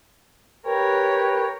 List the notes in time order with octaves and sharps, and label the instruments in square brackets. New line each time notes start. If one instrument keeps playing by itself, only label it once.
[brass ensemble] G4 B4 G5 [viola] A#4 C#5